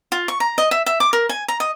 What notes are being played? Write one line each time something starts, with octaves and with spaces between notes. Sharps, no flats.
F4
C#6
A#5
D#5
E5
E5
D6
A#4
G#5
A#5
D#5